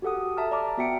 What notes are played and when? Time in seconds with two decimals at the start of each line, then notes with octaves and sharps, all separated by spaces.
0.02 F#4 G4 A4 F#5 D#6
0.37 E5 A5 A#5 F6
0.51 D5 A#5 D6 F6
0.77 B3 F#4 E5 G5 C#7 D7